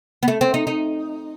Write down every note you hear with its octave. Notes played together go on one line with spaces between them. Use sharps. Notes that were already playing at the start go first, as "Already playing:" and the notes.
B3
A3
C4
D#4
D#4